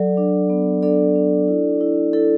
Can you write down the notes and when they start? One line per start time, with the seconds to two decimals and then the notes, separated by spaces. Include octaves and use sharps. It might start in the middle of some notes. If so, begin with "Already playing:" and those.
Already playing: F#3 A4 D5
0.17 D4
0.50 B3
0.83 D4 A4 D5
1.15 D4
1.48 E4
1.81 E4
2.13 E4 A4